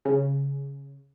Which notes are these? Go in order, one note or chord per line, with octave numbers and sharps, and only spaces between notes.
C#3